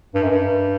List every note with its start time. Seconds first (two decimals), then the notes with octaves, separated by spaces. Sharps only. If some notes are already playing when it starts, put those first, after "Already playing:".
0.14 G2
0.23 F#2
0.31 G2